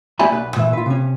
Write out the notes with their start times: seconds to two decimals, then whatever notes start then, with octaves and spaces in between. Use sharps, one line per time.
0.19 A#3 G4 D5 E5 G#5 B5
0.32 B1 B4
0.56 A#2 E3 E5
0.73 F4 B4
0.86 C3 C#4